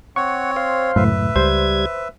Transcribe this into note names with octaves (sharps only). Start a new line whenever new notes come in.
C4 C#5 F#5 C#6
C5 F5
C#2 F#2 A2 B4 E5
C#2 G3 C5 G#6